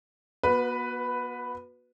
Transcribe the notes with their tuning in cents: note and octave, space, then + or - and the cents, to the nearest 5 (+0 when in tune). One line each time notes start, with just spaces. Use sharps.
B3 -40 F#4 -25 B4 +5